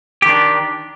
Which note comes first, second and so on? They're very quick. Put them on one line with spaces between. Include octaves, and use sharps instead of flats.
G4 D#3 D4